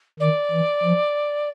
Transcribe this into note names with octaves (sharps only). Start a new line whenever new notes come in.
D#3 D5
E3
F3